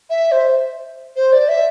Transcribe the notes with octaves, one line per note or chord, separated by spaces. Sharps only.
E5
C5
C5
D5
E5